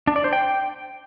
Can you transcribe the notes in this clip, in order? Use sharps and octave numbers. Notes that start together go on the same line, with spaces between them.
D4
D5
C5
G5